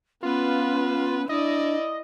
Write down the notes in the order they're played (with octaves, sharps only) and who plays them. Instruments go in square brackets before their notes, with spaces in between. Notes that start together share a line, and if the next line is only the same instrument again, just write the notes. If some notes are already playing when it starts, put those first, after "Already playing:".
[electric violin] B3 B4 [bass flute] C#4 [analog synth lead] F4
[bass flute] D4 [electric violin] E4 D5 [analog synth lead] D#5